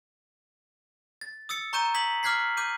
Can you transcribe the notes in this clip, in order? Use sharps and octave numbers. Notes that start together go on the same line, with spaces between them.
A6
D#6 E6 A6 C#7
A#5 C#6 G6 D#7 E7
D#6 G#6 B6 F#7
D6 F6 F#6 G#6 B6 C7
D6 G6 D#7